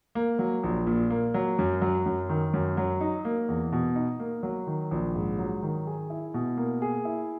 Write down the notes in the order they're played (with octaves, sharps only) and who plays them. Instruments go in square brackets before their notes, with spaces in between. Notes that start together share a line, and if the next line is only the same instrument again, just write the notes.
[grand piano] A#3
F#3
A#1
A#2
A#3
F#3
F#2
F#3
F#2
D#3
F#2
F#3
D#4
A#3
E2
B2
D#4
A#3
F#3
D#3
A#1
G#2
F#3
D#3
G#4
E4
B2
A#3
G#4
E4